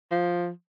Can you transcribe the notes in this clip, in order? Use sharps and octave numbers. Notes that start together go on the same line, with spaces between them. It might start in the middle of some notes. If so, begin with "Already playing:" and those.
F3